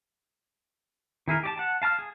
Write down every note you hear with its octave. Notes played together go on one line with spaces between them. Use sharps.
D#3 E4 G#4 A#4
G4 D5 A5
F#5 A5
F5 A5 A#5 F6
G#4